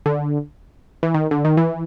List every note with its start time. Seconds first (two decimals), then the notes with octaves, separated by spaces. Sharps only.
0.06 D3
1.03 E3
1.14 D#3
1.31 D3
1.45 D#3
1.57 E3